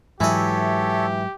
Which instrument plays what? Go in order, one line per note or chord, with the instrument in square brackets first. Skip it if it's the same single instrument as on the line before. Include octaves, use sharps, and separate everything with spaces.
[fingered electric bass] G#2 F#3 [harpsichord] E3 D#5 [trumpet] G4 [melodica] A4 C#5 E5